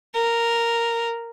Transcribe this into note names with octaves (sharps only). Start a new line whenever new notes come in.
A#4